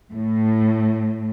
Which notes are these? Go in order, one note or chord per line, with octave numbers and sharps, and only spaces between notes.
A2